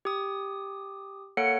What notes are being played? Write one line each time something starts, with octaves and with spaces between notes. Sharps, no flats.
G4 D#6
A#3 A4 C#5 F#5 C#7